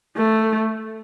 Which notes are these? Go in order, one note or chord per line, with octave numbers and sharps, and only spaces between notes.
A3